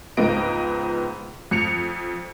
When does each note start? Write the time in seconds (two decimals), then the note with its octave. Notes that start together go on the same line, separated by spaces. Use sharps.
0.17 C#2 G#2 F3 B3 D#5 D7
1.51 F2 C#7 F7